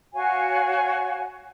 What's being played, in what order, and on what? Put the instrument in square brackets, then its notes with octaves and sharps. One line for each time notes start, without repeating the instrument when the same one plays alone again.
[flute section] F#4 C#5 F5 G#5